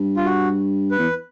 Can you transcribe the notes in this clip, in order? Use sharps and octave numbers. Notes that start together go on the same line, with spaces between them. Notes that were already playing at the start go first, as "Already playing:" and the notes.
Already playing: G2
F4
F#4
B4
E2